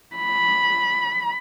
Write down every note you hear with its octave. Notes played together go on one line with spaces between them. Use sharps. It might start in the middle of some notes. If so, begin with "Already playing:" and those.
B5